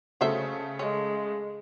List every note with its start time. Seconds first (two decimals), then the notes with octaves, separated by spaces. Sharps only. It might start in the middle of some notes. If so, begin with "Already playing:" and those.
0.21 C#3 F#3 A3 C5 E5
0.79 G#3 C#4